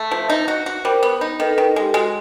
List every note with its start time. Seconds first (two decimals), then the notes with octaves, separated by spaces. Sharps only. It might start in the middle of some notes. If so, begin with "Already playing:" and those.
Already playing: A3
0.11 F3
0.30 D#4
0.48 F#4
0.66 F#4
0.84 G3 A#4 C5
1.03 B3
1.21 D#4
1.39 D#3 A4 B4
1.53 A4 B4
1.58 D#3
1.76 G#3 G4 A4
1.94 G#3 F#4 G#4